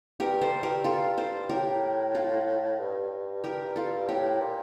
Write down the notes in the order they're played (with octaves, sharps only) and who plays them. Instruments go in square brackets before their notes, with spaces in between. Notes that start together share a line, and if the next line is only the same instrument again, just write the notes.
[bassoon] G2 [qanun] G4 A#4
[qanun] A4 C5
[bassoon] G2
[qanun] G4 A#4
F4 A4
A4 C5
[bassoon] A2 [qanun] G4 A#4
[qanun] F4 A4
[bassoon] G2
[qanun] G4 A#4
F4 A4
[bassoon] A2 [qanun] G4 A#4
[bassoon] A#2